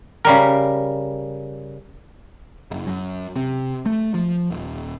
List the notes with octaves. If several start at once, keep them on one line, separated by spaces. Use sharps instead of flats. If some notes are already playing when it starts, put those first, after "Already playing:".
C#3 G3 A#4
F#1
F#2
C3
A3
F3
D#1